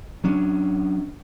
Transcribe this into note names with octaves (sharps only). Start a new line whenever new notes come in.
F#3 C#4 D4